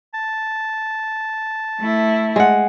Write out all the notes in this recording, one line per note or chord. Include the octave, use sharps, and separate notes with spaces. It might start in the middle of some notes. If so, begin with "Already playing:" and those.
A5
A3 E4
G#3 F#5